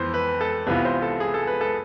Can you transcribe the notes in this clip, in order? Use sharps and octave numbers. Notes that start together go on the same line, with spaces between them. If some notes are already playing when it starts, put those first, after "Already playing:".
Already playing: F2 E3 B3 C5
B4
A4
C2 C3 E3 B3 F4 B4
C5
A4
G#4
A4
B4
A4